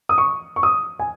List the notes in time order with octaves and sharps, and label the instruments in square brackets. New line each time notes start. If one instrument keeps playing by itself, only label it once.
[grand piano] D#6
C#6
C#6
D#6
G#5